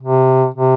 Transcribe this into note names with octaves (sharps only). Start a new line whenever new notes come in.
C3
C3